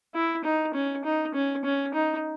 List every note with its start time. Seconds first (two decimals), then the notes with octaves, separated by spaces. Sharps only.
0.14 E4
0.44 D#4
0.74 C#4
1.05 D#4
1.34 C#4
1.65 C#4
1.94 D#4